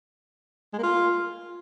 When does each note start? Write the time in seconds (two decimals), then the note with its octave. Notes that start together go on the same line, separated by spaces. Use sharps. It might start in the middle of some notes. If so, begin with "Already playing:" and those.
0.73 G#3
0.78 A#3
0.83 F4